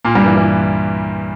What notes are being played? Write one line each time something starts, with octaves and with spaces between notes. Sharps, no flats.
A#2 A#3
G2 G3
E3
E3